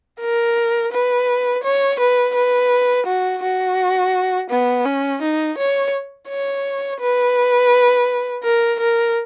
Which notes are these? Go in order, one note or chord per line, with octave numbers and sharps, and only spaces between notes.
A#4
B4
C#5
B4
B4
F#4
F#4
B3
C#4
D#4
C#5
C#5
B4
A#4
A#4